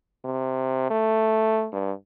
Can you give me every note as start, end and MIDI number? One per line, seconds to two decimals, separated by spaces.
0.25 0.89 48
0.90 1.68 57
1.72 1.92 43